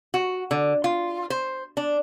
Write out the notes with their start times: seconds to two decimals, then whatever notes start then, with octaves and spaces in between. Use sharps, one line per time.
0.14 F#4
0.51 D3
0.84 F4
1.30 C5
1.77 D4